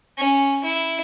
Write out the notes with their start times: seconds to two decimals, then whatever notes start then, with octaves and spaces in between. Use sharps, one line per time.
0.18 C#4
0.64 E4